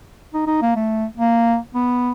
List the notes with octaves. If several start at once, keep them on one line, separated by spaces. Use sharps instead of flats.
D#4
D#4
A#3
A3
A#3
B3